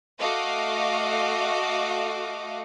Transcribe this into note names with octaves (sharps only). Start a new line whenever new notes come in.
A3 F#4 D#5 F5 D6